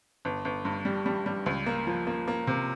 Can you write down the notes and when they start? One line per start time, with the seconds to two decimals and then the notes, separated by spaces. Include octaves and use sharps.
0.25 G1
0.45 G1
0.65 G2
0.85 G3
1.06 G3
1.26 G3
1.46 C#2
1.66 A#3
1.87 F3
2.07 A#3
2.28 A#3
2.47 C3